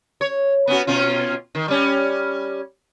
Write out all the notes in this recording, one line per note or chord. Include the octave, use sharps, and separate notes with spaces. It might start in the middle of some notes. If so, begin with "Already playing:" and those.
C#5
B3 C#4 F#4
B2 C#4 F4
D#3
G3 C#4